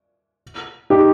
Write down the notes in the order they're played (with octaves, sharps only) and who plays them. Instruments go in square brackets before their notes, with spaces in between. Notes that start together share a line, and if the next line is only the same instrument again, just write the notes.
[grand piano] D#4 G4